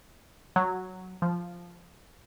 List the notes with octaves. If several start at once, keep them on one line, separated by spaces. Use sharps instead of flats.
F#3
F3